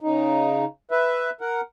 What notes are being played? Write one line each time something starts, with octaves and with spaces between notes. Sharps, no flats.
C#3 D#4
B4 E5
A#4 F#5